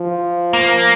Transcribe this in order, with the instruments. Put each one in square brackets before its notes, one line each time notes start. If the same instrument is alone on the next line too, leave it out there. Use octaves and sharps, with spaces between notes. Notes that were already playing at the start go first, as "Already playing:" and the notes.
Already playing: [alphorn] F3
[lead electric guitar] A#3